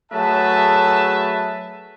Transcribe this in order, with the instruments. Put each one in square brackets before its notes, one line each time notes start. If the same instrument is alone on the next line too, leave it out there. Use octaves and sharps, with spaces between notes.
[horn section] F#3 A3 G#4 B4 E5 A5